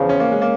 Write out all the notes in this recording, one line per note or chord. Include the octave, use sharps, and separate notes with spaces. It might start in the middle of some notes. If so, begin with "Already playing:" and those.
Already playing: E2 C#3 F3
C#4
A#3
G#3
A#3